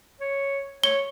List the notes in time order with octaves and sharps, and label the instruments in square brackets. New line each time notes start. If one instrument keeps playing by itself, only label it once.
[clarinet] C#5
[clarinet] C#5 [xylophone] G7